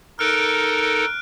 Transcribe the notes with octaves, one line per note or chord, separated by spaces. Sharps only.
D#4 A4 A#4 F6 F#6 D7